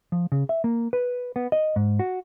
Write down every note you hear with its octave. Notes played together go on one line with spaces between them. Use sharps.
F3
C#3
E5
A#3
B4
B3
D#5
G#2
F#4